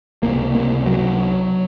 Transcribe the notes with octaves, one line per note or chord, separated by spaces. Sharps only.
C#2 C3 A#3
A#3
F#3